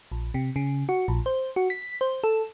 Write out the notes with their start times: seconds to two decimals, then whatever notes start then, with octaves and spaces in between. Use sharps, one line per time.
0.12 A#1
0.34 C3
0.56 C#3
0.89 F#4
1.08 A#1
1.26 C5
1.56 F#4
1.70 B6
2.01 C5
2.24 A4